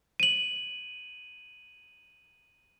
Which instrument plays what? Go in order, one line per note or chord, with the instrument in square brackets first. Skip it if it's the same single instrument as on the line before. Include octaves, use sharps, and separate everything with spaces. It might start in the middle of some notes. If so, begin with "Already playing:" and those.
[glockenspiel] D#7 F#7